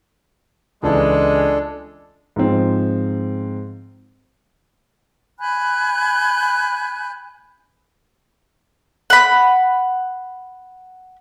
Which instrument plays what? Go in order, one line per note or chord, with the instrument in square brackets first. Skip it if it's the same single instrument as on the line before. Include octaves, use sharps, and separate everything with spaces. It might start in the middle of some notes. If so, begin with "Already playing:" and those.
[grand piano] C#2 E3 [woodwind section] G#3 [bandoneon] D4 A4
[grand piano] G#2 F3 C4
[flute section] G#5 B5 F#6 G6
[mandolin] F#5 B5